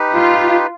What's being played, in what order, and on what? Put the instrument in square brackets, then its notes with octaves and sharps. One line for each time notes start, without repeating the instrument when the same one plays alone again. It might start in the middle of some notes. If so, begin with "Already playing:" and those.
Already playing: [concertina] D#4 G4 B4
[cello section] F4